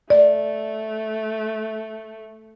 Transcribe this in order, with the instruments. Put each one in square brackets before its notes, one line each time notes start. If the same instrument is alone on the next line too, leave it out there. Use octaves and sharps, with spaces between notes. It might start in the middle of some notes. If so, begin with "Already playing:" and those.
[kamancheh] A3 [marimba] D5